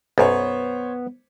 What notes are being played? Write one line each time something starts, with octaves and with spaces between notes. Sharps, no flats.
B1 F#2 B3 C5 C#5